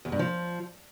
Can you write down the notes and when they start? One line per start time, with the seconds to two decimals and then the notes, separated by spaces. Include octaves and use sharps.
0.05 E2
0.12 G2
0.19 F3